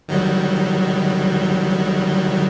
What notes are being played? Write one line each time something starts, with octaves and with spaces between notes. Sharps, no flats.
D#3 F#3 G3